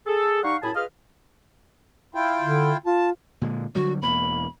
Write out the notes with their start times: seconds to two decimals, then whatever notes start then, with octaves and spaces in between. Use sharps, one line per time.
0.07 G#4 A4
0.43 G3 D#4 F5 F#5 C#6
0.63 F#2 A2 E4 G#4 A5 B5
0.75 F4 G#4 B4 D#5 F5 F6
2.15 E4 F4 G5
2.42 D3
2.86 F4 A5
3.41 A#2 D3 G#3
3.75 D3 F#3 G3 F#4
4.02 E1 E2 A#3 B5